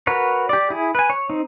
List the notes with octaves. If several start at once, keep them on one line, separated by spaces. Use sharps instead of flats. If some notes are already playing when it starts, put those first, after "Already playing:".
F#4 A#4 B4 C#5
G4 D5
E4 G#4
B4 G#5
C#5
C4 D#4